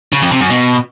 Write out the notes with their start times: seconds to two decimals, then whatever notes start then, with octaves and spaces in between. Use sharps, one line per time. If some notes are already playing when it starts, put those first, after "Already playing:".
0.13 C#3
0.22 F2
0.31 C3
0.41 F#2
0.50 B2